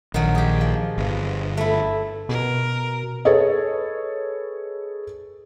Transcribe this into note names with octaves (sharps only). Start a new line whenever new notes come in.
A#1 D#3 F#3
G4 G#4
F3
G1
A3 E4
B2 A#4
G#4 A4 B4 C#5 D#5